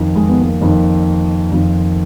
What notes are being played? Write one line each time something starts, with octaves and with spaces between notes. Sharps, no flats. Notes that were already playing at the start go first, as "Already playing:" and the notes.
Already playing: F2 D#3
G#3
B3
A#3
F2 D#3
F2 D#3